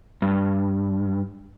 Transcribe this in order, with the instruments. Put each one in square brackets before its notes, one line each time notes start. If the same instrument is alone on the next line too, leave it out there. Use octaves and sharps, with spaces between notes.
[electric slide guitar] G2